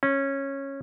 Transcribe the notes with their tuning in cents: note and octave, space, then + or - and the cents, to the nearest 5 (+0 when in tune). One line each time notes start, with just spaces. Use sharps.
C#4 -15